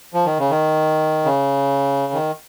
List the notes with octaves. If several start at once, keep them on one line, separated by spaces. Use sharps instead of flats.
F3
D#3
C#3
D#3
C#3
D#3